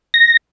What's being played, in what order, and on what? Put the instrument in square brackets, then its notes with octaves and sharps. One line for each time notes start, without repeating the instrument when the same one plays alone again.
[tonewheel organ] A#6